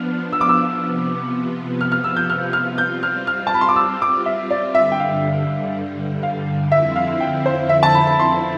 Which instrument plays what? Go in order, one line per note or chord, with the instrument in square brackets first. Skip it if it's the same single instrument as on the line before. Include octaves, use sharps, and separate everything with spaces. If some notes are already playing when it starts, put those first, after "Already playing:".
Already playing: [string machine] F3 B3 D4 [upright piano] F6
[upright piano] E6
D6
E6
[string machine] C3 F3 B3
[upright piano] F6
F6
E6
G6
F6
F6
[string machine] G3 C4 F4 [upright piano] G6
[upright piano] F6
F6
A5
B5
C6
D6
E6
D6
E5
D5
[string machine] G2 D3 G3 [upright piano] E5
[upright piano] G5
F5
F5
[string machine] F2 D3 F3 C4 E4 [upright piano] E5
[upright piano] F5
G5
C5
E5
A5
B5
B5
C6